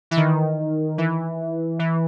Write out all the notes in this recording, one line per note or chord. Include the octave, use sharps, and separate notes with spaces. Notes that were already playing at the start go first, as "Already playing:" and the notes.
E3
D#3
E3
E3